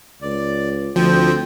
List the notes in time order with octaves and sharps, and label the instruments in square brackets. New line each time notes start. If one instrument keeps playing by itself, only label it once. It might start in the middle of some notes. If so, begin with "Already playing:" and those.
[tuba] C#2 [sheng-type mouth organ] D5
[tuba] D2 [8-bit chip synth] F3 [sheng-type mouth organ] C4 G5